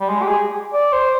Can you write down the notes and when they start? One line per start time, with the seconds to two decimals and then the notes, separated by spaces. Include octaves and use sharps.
0.01 G3
0.09 G#3
0.22 G4
0.28 G#4
0.74 D5
0.93 C5